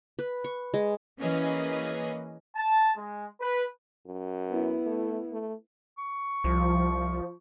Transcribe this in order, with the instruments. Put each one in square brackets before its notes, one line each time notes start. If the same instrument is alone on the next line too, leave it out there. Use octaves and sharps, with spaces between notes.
[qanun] B4
C#6
G#3
[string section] E3 A#3 C#4 G#4 B4 D#5
[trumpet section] A5
G#3
B4
[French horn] F#2
[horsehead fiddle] B3 E4
[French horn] A3
A3
[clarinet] C#6
[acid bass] C2 [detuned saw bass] F3